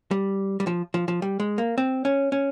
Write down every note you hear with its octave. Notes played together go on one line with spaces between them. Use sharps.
G3
G3
F3
F3
F3
G3
G#3
A#3
C4
C#4
C#4